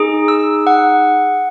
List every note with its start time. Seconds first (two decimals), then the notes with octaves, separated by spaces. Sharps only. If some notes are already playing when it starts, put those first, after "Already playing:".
Already playing: D#4 G#4
0.28 E6
0.67 F#5